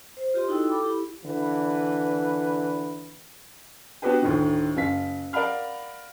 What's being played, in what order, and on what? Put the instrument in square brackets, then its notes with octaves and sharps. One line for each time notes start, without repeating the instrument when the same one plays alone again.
[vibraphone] C5
F4 G4 D#5 C6
D#4 E4 F#4 A4 G5 E6
A4 B5 D6
E4 G4
[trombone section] D3 E3 B4
[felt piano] B3 D4 F#4 G4 B4 G5
D2 A2 D#3
F#1 F5 B6
A#4 D5 F5 F#5 B5 F6